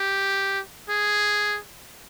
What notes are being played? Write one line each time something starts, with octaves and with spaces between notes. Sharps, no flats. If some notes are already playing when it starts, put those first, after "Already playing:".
Already playing: G4
G#4